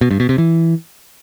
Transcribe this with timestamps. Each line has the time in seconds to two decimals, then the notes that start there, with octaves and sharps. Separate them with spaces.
0.01 B2
0.11 G2
0.20 B2
0.29 C3
0.38 E3